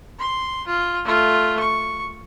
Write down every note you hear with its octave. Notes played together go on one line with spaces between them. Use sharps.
C6
F4
A3 F4
C#6